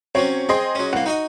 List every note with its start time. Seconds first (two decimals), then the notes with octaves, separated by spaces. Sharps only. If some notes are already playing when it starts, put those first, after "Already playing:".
0.15 C3 F#3 C#4 C#5
0.49 C4 G#4 D#5 C6
0.75 F#3 C#4
0.93 C2 A#3 F#5
1.06 D#4 F#4 D#5